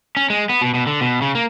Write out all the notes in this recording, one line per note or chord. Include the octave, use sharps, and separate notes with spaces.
C#4
G#3
B3
B2
B2
D3
B2
C#3
A#3